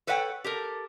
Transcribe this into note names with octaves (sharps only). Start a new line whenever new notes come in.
A4 B4 C#5 E5 F#5 G5
G4 A4 A#4